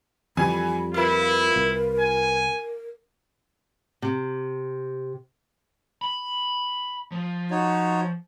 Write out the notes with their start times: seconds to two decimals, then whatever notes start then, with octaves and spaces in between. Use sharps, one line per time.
0.37 F2 E3 G3 G#5 B5
0.94 E4 F4 A#4 B4
1.56 C2
2.00 G#5
4.02 C3
6.01 B5
7.12 F3
7.51 D#4 F#4 C#5